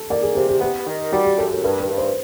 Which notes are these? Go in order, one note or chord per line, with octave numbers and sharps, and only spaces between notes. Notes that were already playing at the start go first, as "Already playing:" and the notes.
Already playing: A4
A#3 D5
G#4
C3 G4
G4
B3 G4
D#3
G3 F#4
G4
F#2 A4
A4
G2 A#4
B4
G2
C5